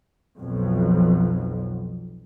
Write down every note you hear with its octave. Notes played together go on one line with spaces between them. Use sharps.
B1 F2